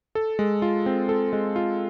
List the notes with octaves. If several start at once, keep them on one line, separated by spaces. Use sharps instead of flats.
A4
G#3
F4
C4
A4
G#3
F4